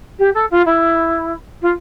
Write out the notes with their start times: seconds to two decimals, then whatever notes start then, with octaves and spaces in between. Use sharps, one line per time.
0.18 G4
0.34 A4
0.50 F4
0.65 E4
1.62 F4